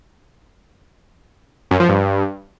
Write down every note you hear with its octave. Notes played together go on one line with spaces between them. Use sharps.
F#2
F3
G2